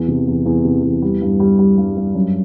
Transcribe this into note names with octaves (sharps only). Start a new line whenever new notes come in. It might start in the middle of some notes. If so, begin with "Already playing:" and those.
Already playing: E2
C3
E2
E2
C3
E2
G3
G2
G3
G3
G2
G2
F#2